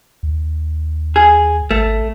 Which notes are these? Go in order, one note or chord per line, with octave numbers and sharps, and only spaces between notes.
D#2
G#4
G#1 A3